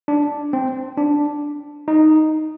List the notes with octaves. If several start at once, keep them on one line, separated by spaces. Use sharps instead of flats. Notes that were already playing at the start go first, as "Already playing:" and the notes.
D4
C4
D4
D#4